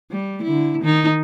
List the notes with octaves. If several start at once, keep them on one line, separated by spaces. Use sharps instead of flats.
G3
D3 E4
D#3 D#4